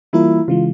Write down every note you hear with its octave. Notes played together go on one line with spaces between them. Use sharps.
E3 G3 A#3 E4 F4 A#4
C#3 E3 G#3 F4